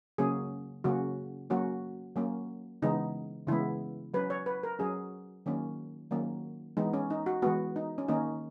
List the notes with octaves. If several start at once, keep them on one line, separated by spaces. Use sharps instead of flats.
C#3 F#3 A#3 C#4 G#4
C#3 F#3 A#3 C#4 F#4
F#3 A#3 C#4 F#4
F#3 A#3 C#4
C#3 E3 G#3 B3 D#4
C#3 E3 G#3 B3 E4
F#3 C#4 B4
C#5
B4
A#4
F#3 C#4 G#4
D#3 F#3 A#3 C#4
D#3 F#3 A#3 C#4
E3 G#3 B3 D#4
C#4
D#4
F#4
E3 G#3 B3 F#4
D#4
C#4
D#3 A#3 C#4 D#4